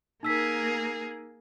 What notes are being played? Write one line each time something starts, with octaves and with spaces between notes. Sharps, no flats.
A#3 D#4 G#4 A#4 E6 B6